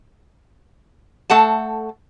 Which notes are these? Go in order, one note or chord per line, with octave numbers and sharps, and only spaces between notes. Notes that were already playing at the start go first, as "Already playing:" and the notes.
A3 A4 F#5 A5